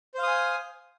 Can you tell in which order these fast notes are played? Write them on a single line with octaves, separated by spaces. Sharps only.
C5 F5 D#6 G#5